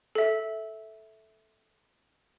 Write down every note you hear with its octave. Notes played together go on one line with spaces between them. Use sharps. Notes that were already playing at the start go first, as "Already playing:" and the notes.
A4 E5